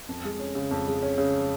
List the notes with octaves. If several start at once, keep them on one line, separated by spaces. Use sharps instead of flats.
F2
G#3
C#4
C#3
F2
G#3
C#4
C#3